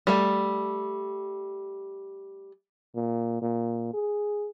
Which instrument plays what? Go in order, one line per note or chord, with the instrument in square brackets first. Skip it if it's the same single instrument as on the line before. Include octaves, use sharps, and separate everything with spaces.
[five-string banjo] G3 A3
[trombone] A#2
A#2
G#4